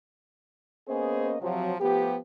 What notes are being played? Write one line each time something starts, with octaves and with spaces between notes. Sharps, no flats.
A#3 B3 C#4 G#4 C5 D#5
C3 F3 F#3
F3 A3 B3 G4